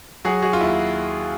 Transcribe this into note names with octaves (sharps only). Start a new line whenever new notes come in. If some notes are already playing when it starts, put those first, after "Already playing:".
F#3 F#4 G#4
F#4 G#4
F4
D#2 E4